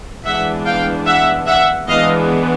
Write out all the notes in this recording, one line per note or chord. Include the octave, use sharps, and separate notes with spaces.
E3 G#3 B3 D4 E5 F#5
F5 G5
E5 F#5
E5 F#5
E3 G#3 B3 D4 D#5 F5